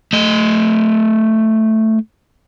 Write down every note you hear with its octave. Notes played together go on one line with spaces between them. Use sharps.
A3 D#5